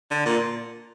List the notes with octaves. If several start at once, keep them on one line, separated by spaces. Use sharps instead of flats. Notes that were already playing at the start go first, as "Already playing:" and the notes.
D3
A#2